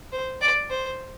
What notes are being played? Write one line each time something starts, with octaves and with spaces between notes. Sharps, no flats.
C5
D5
C5